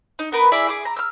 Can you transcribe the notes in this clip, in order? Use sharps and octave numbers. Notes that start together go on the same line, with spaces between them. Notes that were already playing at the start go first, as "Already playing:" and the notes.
D#4
B3 A#4 B4
E4 G#4 D5 E5
G#4 D6
A#5
E6 F6